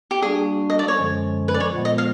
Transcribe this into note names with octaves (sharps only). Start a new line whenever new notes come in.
G4
G3 A#3 D4 F#4 G#4
D#5
D5
C#5
F#2 D3 F3 G#3 C#4
B4
D5
C#5
A#2 F3 G#3 B3
D#5
F5